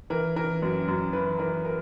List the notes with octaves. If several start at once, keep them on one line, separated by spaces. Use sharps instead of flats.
E3 A#4
E3 A#4
F#2
F#2
E3 B4
E3 A#4
A#4